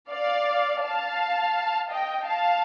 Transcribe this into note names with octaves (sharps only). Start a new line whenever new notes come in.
D5 F5
F5 A5
D#5 G5
F5 A5